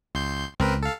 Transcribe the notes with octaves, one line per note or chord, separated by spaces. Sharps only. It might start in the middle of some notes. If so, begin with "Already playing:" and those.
C#2 C6 G6
C#2 C4 A#4 B4
A4 F5